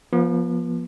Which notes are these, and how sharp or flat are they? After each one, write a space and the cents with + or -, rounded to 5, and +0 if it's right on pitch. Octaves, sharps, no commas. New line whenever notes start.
F3 +0 B3 -40